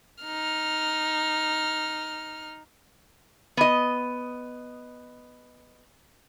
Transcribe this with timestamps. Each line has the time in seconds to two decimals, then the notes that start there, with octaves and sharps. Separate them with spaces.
0.24 D#4 F6
3.57 B3 D#5